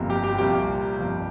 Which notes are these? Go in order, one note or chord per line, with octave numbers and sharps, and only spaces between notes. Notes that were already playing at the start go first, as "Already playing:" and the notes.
Already playing: G1 F2 C3 F3 A#3
G4
G4
C2 A#2 F3 A#3 G4
G1 F2 C3 F3 A#3